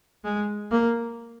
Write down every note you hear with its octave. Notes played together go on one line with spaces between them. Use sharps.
G#3
A#3